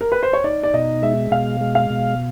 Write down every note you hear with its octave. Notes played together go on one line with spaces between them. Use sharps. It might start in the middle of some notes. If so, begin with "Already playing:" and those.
A#4
B4
C5
C#5
D#4 D5
D5
B2 D#5
G#3 E5
B2 F5
G#3
F5
B2